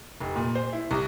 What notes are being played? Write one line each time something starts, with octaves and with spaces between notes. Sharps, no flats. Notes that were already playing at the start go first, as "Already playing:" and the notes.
F1
A#2
C5
E4
C2